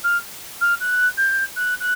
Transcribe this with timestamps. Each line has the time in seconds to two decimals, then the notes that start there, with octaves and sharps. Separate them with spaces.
0.03 F6
0.61 F6
0.80 F#6
1.17 G6
1.56 F#6
1.80 F#6